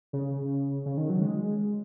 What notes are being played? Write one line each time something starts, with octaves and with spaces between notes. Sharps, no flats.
C#3
C#3
D#3
F#3
G#3